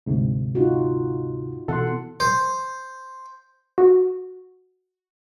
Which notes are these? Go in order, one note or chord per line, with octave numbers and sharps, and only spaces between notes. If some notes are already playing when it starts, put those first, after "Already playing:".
D2 G#2 C3
D#4 F4 F#4
B2 E3 A4 F#5 C6
C5
F#4